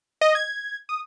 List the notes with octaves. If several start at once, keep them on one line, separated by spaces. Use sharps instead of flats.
D#5
G#6
D#6